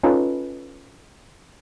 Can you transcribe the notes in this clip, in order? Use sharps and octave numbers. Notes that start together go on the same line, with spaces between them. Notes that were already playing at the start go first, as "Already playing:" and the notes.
C#4 D#4 F4 A4 B4